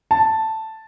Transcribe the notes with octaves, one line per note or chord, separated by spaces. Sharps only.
A5